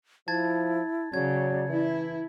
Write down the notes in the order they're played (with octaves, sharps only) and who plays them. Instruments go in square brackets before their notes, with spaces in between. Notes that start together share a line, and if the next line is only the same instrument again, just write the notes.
[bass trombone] F3 [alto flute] E4 [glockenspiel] A5 G#6 A6
[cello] C#3 [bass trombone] F#3 [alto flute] D5 [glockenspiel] G#6
[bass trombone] E3 [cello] E4